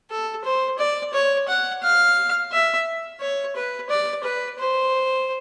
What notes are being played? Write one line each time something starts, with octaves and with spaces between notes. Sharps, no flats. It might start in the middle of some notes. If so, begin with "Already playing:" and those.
A4
C5
D5
C#5
F#5
F5
E5
C#5
B4
D5
B4
C5